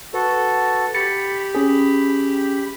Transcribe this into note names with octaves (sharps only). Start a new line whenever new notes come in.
F#4 A4 B4
G4 B5 A6 C#7
C#4 G#4